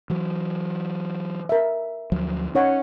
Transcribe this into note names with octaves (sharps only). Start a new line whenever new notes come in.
E3 F#3
A#4 E5
D2 F3 F#3
C#4 D#4 C#5 F#5